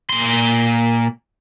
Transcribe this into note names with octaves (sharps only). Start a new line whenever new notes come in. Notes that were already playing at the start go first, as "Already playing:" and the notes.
A#2 C6